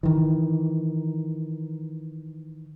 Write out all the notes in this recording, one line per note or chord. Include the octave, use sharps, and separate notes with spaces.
D#3 E3